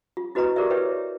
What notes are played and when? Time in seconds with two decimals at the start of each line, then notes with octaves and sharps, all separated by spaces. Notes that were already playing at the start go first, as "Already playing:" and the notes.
0.17 F4
0.35 E4 F#4 B4 D#5 A#5 C#6
0.56 G4 G#4 A#4 C5 D5 E5
0.70 E4 B4 C#5 E5 G5